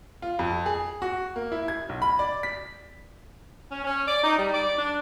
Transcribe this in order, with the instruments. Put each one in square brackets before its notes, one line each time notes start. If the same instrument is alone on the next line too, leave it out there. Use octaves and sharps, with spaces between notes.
[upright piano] F4
F2
G#4
F#4
A#3
E4
G#6
B1
B5
D5
B6
[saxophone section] C#4
C#4
D5
D#4
G3
D5
D4